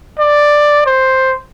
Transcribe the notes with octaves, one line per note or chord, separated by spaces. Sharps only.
D5
C5